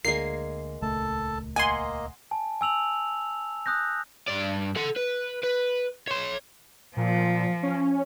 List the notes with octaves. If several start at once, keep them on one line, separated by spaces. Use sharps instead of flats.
D2 D3 G#3 A#3 C7
D#1 C#2 A3 A4 A5
A#3 D#5 F#5 G#5 C6
G#5 A5
G#5 E6 F7 F#7
D#6 F#6 G6 A#6
G2 D5
A4 F#5
B4
B4
C#5 C6
A#2 F3
C#4